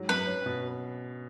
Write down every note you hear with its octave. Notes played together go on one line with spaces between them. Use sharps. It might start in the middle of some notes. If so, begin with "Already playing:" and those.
Already playing: G#2 F#3
F#2 B4
C#4
B2